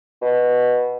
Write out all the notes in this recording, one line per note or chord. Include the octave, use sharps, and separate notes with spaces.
B2